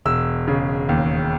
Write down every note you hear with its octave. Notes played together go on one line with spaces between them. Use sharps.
E1 E6
C#3
D#2